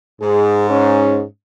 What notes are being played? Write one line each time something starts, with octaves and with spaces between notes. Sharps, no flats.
G#2 G#4
C#4